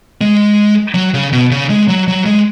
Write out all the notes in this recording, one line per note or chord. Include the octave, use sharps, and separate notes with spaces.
G#3
F#3
C#3
B2
C#3
G#3
F#3
F#3
G#3